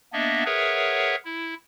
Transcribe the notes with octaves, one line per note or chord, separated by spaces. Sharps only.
A#3 B3 D4 D#5 E5
G#4 A#4 B4 C#5 E5 F#5
E4